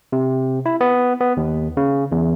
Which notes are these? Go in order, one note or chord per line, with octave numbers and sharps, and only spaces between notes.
C3
E4
B3
B3
D#2
C#3
E2